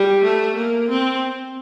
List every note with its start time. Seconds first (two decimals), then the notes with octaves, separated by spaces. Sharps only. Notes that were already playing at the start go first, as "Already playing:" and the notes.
Already playing: G3
0.24 A3
0.56 A#3
0.89 C4